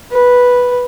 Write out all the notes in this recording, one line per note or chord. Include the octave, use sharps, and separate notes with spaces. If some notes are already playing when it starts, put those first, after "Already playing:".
B4